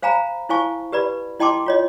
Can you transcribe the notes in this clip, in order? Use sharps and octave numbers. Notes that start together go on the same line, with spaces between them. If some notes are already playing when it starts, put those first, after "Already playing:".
C5 F5 G#5 A#5 B5
E4 C5 F5 G#5 A5 C#6
G4 B4 D5 B5
E4 D#5 G5 A5 C6 D6
F4 C#5 D#5